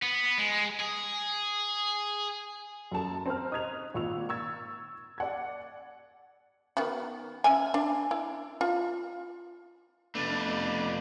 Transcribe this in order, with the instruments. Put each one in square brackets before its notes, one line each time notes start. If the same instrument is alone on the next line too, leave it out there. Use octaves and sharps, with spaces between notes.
[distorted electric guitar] B3
G#3
G#4
[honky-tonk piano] F#2 A4 A5
C4 C5 A#5 F6
D#4 D#6 F#6 G#6 F7
G#1 A#2 C#6 E6 F7
C#6 E6 G#6 A6
D5 F#5 G#6
[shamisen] D#3 B3 F#4
C#4 E5 G#5
D4
E4
F4
[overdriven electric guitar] F2 A3 [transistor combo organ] B3 D4